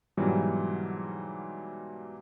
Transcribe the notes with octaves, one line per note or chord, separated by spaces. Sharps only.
G#2 B2 E3 F#3 G3